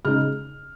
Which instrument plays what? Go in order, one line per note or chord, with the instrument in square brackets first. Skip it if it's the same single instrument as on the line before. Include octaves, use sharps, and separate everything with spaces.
[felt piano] C#3 G#3 D#4 F6